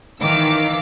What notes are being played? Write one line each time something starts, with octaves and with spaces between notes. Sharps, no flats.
D#3 E3 F5 D6 E6